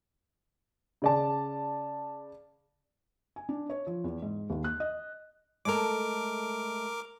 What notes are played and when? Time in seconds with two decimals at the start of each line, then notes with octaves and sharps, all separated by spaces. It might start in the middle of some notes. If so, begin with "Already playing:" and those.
1.02 C#3 D5 A5
3.36 G#5
3.49 D4
3.70 C#5
3.87 F3
4.04 E2
4.22 G#2
4.50 D#2
4.64 F#6
4.80 D#5
5.65 G#3 A3 A#4 A5 D6